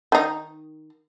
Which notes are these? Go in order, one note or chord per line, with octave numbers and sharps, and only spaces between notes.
D#3 D#4